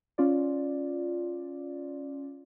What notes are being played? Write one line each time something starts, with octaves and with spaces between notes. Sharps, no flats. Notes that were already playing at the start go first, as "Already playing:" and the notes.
C#4 F4 D5